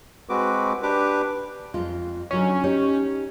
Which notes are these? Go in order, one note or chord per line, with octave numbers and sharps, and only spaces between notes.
G#3 C4 F#4 B4 D6
D4 G4 B4 D6
F2 G#3 F4
D3 F#3 C#4 D#4
D#4 G4 C#5